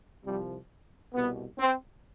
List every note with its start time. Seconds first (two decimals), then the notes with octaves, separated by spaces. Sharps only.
0.25 C2 C3 F3 G3
1.13 C2 B2 B3
1.58 C4